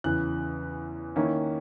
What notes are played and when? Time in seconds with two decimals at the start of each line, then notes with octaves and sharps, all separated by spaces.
0.04 E2 C#3 E3 F#6
1.16 D#3 A#3 C#4 E4